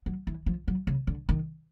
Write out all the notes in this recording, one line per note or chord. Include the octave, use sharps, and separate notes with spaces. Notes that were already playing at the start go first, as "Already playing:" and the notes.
F#3
E3
F3
F#3
C#3
D3
D#3